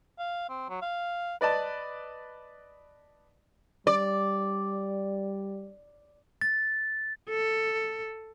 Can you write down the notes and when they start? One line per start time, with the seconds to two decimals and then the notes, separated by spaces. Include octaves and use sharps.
0.19 F5
0.49 C4
0.69 F#3
0.82 F5
1.41 B4 D5 D#5 A5
3.87 G3 D5
6.41 A6
7.30 A4